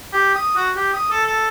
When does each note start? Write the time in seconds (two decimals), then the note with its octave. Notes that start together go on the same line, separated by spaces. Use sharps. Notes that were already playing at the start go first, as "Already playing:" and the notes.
0.13 G4
0.35 D#6
0.56 F#4
0.76 G4
0.94 D#6
1.10 A4
1.26 A4